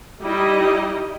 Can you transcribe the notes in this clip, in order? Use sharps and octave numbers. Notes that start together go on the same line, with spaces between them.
G3 D#4 E4 D#5